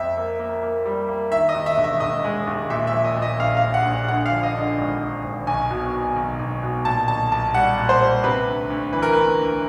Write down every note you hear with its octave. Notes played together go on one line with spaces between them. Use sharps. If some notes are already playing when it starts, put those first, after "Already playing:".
Already playing: F2 E5
A#3
A#3
A#3
G3
A#3
D#3 E5
D#5
D#2
E5
E1
E5
E1 D#5
G#3
D#2
A#2 E5
E5
F3
D#5
A#2
D#5
A#1 F5
F5
A#1
F#5
A#1
D3 F#5
F5
F3
D#5
D3
D#5
G#1
D3
G#1
B1 G#5
B2
B2
B1
B1
B2
A#2 A5
B1 A5
B1 A5
G3 F#5
A#2
C5
G3
C3 B4
D2
D2
E3 B4
A#4
B4
D2
D2